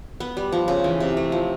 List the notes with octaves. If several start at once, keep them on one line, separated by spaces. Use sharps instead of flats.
B3
G3
F3
C#3
E3
C3
A3
F3